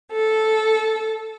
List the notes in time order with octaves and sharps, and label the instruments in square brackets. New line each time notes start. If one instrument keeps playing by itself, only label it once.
[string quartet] A4